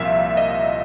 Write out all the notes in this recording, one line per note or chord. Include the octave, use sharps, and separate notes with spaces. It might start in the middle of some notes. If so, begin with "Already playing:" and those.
Already playing: C2 A#2 F3 E5 F5
D#5